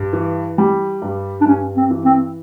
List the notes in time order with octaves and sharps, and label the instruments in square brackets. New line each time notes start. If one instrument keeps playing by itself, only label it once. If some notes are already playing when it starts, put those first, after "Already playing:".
Already playing: [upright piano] G2
E3
G3
G2
[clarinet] D4
[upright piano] G2 [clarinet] C#4
[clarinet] C4
[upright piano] E3
[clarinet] C4